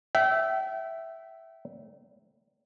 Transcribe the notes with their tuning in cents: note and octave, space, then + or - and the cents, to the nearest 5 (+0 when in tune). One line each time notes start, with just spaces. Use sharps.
E5 +0 G5 -35